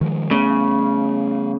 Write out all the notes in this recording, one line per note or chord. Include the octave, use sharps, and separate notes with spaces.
D#3 F3 G#3
C#3 A3 B3